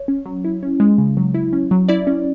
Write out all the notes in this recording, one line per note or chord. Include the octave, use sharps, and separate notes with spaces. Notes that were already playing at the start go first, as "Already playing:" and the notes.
Already playing: C#5
C#4
F#3
E4
C#4
G#3
C#3
F#3
E4
C#4
F#3
E4 D5
C#4